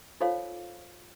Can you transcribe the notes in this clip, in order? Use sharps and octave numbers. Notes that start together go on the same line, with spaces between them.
D#4 F4 A4 C5 C#5 F5